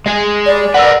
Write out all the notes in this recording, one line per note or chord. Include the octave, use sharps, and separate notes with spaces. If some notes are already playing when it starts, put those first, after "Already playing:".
G#3 G#4 D#5
D5
A#4 B4 F#5 E6